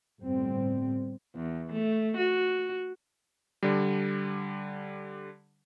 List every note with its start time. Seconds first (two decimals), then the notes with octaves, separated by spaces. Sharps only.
0.23 G1 A2 G3 C4
1.35 E2
1.72 A3
2.17 F#4
3.63 D3 G3